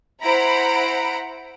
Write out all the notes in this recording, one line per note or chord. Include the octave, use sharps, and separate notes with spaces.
E4 C5 F#5 A#5 B5 D7